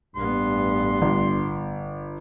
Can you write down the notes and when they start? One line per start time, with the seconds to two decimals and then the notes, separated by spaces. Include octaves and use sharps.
0.16 A1 G2 B3 C6
1.02 G1